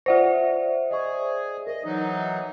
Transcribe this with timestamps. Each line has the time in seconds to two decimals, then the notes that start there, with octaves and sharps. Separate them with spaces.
0.06 F4 C5 D5 E5 F#5 A#6
0.91 G#4 D#5 C#6
1.67 A#4 D#5
1.84 E3 F#3 D#4